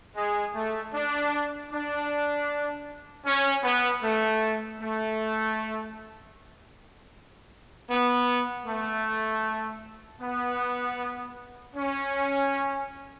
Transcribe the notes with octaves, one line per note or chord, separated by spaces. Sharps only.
G#3
A3
D4
D4
C#4
B3
A3
A3
B3
A3
B3
C#4